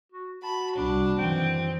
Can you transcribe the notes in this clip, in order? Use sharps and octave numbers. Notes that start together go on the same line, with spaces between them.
F#4
F#4 A5 B5
C2 D4
F#2 D#3 E3 C4 G5